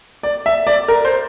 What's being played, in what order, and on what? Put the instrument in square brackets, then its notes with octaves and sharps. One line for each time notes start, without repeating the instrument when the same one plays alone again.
[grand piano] D5
E5
D5
A#4
C5